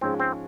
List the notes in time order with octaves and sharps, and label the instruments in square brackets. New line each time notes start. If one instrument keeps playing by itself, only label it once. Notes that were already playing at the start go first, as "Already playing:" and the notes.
[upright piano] G#2 F3 G#3 C#4 [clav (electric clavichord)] C4
[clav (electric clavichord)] C4